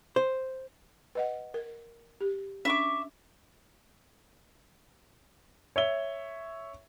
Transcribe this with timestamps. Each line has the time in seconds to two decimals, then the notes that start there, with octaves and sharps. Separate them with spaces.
0.16 C5
1.15 B4 D#5 F#5
1.54 A#4
2.21 G4
2.65 C#4 D4 E5 C#6 D6
5.76 C#5 E5 G7